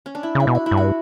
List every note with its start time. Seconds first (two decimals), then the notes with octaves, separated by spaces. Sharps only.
0.06 C#4
0.15 D4
0.23 E4
0.35 C#3 E4
0.47 B2
0.55 F#4
0.66 E4
0.71 G2
0.77 F#4